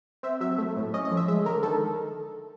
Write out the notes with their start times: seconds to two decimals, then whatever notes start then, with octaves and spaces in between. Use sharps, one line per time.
0.23 C4 E5
0.41 F#3 E5
0.58 A3
0.77 A2
0.94 C#4 D#5
1.05 D#5
1.11 F3
1.17 E5
1.28 G#3 E5
1.45 D3 A#4
1.63 D#3 A4